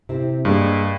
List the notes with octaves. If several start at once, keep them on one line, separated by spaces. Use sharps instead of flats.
C3 C4 E4
G2 G#3 A#3